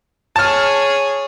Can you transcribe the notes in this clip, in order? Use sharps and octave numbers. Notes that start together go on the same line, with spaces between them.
G#4 C#5 A5 F6